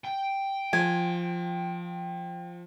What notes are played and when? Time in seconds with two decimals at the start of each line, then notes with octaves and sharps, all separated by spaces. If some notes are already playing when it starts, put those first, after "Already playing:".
0.05 G5
0.73 F3 G#5